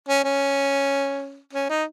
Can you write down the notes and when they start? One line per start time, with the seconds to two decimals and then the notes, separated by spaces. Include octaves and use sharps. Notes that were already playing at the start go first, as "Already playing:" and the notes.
0.09 C#4
0.24 C#4
1.53 C#4
1.69 D#4